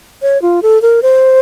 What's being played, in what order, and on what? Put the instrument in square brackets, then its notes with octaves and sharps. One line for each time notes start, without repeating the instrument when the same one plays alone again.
[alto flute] C#5
F4
A4
A#4
C5